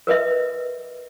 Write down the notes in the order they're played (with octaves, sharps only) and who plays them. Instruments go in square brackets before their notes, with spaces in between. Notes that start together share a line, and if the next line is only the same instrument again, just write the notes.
[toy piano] A#4 B4 D#5 E5